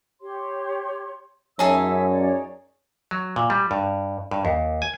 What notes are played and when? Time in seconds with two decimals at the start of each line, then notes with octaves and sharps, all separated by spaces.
0.22 G4 C#5 C6
1.59 F#2 C#4 D#4 G#4 C#5 E5 A5 E6
2.09 C#5 D5
3.11 F#3
3.36 A#2
3.50 G3
3.71 G2
4.31 G2
4.45 D#2
4.82 G#5